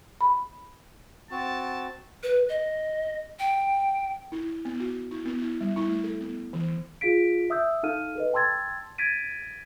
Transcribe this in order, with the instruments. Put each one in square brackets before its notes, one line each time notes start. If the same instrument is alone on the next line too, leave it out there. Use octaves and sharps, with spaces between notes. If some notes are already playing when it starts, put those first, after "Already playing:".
[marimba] B5
[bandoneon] C4 F#4 [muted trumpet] A5
[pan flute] B4
D#5
G5
[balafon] E4
B3
F#4
E4
B3
E4
G3
E4
A3
A4
B3
E3
[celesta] F4 G#4 F5 B6 D7
E5 D#6 E6 G6
D#4 A4 F5 F6 D#7
A4 B4 D#5
G5 A5 C6 E6 G#6 A6
G#6 A6 B6 D7 D#7